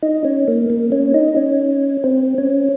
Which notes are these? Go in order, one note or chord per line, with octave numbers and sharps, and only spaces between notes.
D#4
C#4
A#3
A#3
C#4
D#4
C#4
C4
C#4